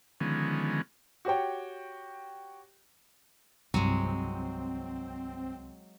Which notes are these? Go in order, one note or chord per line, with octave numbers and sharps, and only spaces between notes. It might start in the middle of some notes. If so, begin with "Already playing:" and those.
D3 D#3 F3 G#3 B3 C#4
F#4 G4 C#5 G5
C2 G2 F#3 G#3 C4 E4